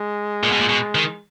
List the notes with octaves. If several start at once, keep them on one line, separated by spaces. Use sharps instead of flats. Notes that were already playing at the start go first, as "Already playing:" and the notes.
Already playing: G#3
A#2
B2
A#2
B2
D#3